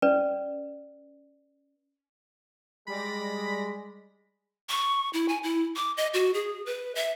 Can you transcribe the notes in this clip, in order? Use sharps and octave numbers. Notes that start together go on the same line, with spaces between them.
C#4 B4 D5
G3 G#3 D5 B5 A#6
C#6
E4
G#5
E4
D6
D#5
F#4
G#4
B4
E5